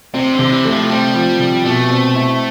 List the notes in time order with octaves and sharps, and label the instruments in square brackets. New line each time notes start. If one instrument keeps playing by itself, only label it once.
[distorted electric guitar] C3 [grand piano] C4
[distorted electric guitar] D3
[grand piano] C3
[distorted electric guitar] E3
[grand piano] A3
[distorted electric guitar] F3
[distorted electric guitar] G3 [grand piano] C4
[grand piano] F3
C3
[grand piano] B2 [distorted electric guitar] A3
[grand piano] C4
E4